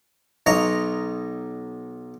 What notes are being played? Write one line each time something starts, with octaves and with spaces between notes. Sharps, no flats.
B1 C#5 D#5 A#5